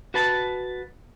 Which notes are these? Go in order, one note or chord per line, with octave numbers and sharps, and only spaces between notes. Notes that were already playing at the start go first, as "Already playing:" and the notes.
F#4 B4 A5